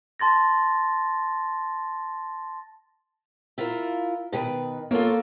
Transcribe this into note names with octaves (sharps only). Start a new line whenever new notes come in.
A5 C6 A6 A#6
E4 F4 A#4
B2 D#3 B4
A#3 F4 A4 C#5